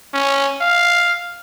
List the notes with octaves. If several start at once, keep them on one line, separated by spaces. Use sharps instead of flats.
C#4
F5